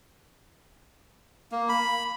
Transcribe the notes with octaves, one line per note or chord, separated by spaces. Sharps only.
A#3
B5